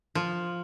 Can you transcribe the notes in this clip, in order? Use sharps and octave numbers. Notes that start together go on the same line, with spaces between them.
F3